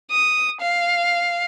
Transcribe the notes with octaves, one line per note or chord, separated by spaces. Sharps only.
D#6
F5